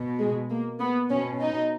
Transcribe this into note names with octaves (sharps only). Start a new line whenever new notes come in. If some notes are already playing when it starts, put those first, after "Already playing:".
Already playing: B2
G#3
A#3
B3
B2 C#4
D#4